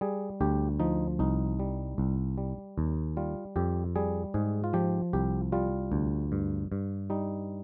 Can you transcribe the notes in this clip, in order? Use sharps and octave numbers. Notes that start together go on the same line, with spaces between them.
G3 G#4
D2 G4
F3 D#4
C2 D#4
G3
C2
G3
D#2
G3 F4
F2 G4
G3 G#4
G#2 G#4
F4
F3 G4
C2 G4
G3 F4
D2
G2
G2
G3 D#4